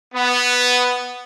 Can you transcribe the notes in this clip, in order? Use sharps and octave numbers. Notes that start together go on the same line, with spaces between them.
B3